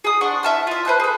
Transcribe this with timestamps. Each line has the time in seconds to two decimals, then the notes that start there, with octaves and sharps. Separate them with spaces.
0.04 G#4 D#6
0.21 D4 F#5 C6 C#6
0.43 E4 E5 A5 F6
0.67 F4 E5
0.85 B4 C5 A5 F#6
1.00 G#4 A4